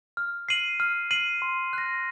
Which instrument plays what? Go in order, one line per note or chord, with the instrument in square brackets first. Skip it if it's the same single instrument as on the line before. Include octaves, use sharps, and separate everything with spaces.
[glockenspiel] F6
C7 D#7 F#7
F6
C7 D#7 F#7
C6
F#6 A#6